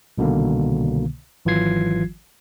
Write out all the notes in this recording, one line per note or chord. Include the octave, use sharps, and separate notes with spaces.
C2 B2 D3 D#3 A#3
G#1 E3 F#3 F4 G#6 C7